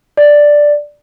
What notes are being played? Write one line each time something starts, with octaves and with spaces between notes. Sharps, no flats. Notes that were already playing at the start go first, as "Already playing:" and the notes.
D5